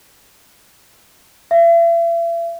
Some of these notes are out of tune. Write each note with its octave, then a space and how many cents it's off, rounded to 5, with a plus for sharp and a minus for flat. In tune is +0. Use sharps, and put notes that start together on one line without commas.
E5 +40